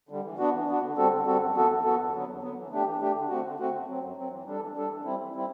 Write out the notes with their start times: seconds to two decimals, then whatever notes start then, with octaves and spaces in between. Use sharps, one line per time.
0.09 D3 G3
0.24 E3
0.39 B3 D4 F#4
0.53 E3
0.67 B3 D4 F#4
0.81 D3
0.96 G3 C4 F#4 A4
1.11 D3
1.25 G3 C4 F#4 A4
1.39 F#2
1.55 E3 B3 F#4 A4
1.69 F#2
1.84 E3 B3 F#4 A4
1.98 E2
2.12 D3 F#3 B3
2.27 E2
2.42 D3 F#3 B3
2.56 E3
2.71 A3 D4 G4
2.85 E3
3.00 A3 D4 G4
3.14 D3
3.29 A3 C4 F#4
3.44 D3
3.58 A3 C4 F#4
3.73 F#2
3.87 F#3 C4
4.01 F#2
4.17 F#3 C4
4.31 E3
4.46 G3 D4 A4
4.60 E3
4.75 G3 D4 A4
4.90 E3
5.04 G3 C4 E4
5.19 E3
5.33 G3 C4 E4